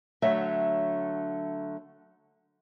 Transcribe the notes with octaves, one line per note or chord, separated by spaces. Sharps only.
D3 F#3 A3 C#5 E5